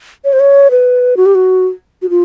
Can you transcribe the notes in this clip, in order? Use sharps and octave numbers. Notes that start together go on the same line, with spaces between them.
C#5
C5
C#5
B4
F#4
G4
F#4
F#4
F4